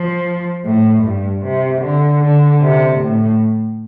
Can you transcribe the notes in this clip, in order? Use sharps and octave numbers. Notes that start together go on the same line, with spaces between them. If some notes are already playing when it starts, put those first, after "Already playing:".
Already playing: F3
A2
G2
C3
D3
D3
C3
A2